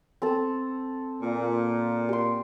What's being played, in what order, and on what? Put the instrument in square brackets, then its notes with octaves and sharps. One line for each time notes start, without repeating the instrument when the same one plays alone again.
[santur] C4 A4
[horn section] A#2
[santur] G4 C6